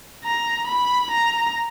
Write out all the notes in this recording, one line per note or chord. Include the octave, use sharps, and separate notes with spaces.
A#5
B5
A#5